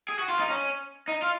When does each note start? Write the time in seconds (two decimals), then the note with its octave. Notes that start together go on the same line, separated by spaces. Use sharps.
0.09 G#4
0.19 F#4
0.29 F4
0.39 D#4
0.50 C#4
1.08 D#4
1.22 F4